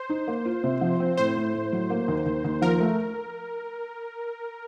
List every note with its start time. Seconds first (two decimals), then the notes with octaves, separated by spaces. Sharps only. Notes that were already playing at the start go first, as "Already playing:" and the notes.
Already playing: C5
0.10 D#4
0.28 A#3
0.45 F4
0.64 C3
0.81 F3
1.00 C4
1.18 A2 C5
1.36 A2
1.54 A2
1.72 F#3
1.90 A#3
2.08 D#2
2.26 D#2
2.44 D#2
2.62 F3 A#4
2.80 A3